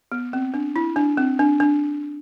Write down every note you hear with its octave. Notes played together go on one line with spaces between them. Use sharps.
B3
C4
D4
E4
D4
C4
D4
D4